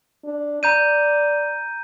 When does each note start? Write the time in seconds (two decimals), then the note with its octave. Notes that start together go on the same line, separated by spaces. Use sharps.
0.24 D4
0.63 D5 A#5 G6 D#7